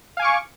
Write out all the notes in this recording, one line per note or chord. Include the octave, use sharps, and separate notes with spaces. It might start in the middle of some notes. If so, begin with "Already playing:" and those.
F5 G#5 C#6 D6